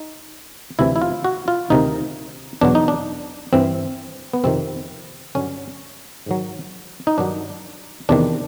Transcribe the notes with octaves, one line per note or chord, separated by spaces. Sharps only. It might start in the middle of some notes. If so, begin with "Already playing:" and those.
Already playing: D#4
D2 C3 E3 E4
E4
F4
F#4
F4
D2 C3 D#3 D#4
E2 B2 F#3 D4
D#4
D4
G2 E3 C4
B3
F2 C3 D#3 C4
G2 D3 F#3 C#4
G#2 D#3 F#3
D#4
G2 D#3 F#3 D4
E2 C3 D#3 D4